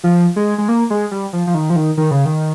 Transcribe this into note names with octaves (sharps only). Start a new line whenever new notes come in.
F3
G#3
G#3
A#3
G#3
G3
F3
F3
D#3
F3
D#3
D#3
C#3
D#3